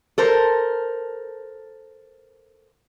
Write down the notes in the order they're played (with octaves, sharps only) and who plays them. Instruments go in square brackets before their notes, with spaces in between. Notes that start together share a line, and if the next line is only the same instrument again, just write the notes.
[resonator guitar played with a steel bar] A4 A#4 C5